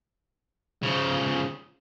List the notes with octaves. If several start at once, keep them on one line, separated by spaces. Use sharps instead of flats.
C#3 F3